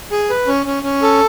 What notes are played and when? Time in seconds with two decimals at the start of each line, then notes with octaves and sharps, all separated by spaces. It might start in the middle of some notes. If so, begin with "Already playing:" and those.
0.12 G#4
0.30 B4
0.47 C#4
0.66 C#4
0.83 C#4
1.02 A4